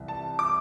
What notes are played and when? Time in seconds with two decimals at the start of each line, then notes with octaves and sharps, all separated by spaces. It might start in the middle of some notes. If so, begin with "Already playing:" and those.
Already playing: C2 C3 E3
0.08 A5
0.39 D6